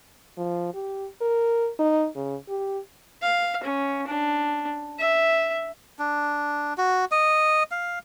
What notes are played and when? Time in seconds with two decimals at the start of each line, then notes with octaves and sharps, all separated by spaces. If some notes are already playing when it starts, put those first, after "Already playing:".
0.38 F3
0.74 G4
1.21 A#4
1.79 D#4
2.16 C#3
2.49 G4
3.22 F5
3.63 C#4
4.07 D4
4.99 E5
5.99 D4
6.78 F#4
7.11 D#5
7.71 F5